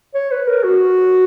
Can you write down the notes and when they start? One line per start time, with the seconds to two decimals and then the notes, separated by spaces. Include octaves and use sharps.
0.14 C#5
0.31 B4
0.47 A#4
0.64 F#4